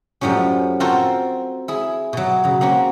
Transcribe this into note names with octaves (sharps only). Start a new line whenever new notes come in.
F#2 A2 F3 G3 C#4
C4 F4 F#4 A4 A#4 C5
E4 G#4
B2 F#3
C#3 F#3
A#3 C4 C#4 F#4